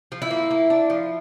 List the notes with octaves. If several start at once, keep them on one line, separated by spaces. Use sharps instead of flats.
F3
E4
A#3
A#3
D4
F3